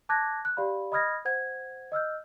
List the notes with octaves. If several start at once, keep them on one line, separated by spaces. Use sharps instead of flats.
A5 D6 F#6 G#6 A#6
F#6
G4 D5 F5 B5
D#5 B5 D#6 F6 G#6 A#6
C5 F#5 G#6
D#5 E6 F6 G6